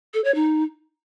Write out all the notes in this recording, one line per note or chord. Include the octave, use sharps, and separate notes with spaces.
A4
C#5
D#4